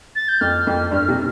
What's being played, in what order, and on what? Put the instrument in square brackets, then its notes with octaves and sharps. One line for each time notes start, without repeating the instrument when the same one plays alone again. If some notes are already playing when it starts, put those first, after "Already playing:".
[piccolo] A6
G6
[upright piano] F2 [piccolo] F6
[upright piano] F2
G2
C3